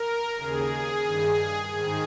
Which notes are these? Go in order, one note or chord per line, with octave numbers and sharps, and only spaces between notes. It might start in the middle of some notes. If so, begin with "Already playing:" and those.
Already playing: A#4
D#2 C#3 G#4
G2 D#3
G#2 D#3 G#4